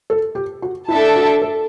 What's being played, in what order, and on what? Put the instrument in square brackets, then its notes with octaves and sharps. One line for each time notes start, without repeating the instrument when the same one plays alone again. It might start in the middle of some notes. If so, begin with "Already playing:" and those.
[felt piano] A4
G4
F#4
[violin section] D4 A4 E5 A5 [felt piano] E4
[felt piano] F#4
A4